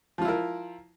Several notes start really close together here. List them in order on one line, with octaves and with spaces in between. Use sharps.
F3 F4 E4 A#4